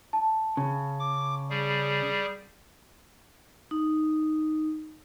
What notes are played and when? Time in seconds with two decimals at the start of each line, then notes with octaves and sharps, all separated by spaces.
0.13 A5
0.57 C#3
0.99 D6
1.50 G3 G#4
3.71 D#4